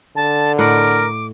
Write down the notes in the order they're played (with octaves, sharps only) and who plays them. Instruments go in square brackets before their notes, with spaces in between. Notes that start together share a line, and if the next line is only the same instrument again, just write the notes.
[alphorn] D3 [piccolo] A5
[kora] A2 D#5 F#5 [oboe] A#4 [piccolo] D6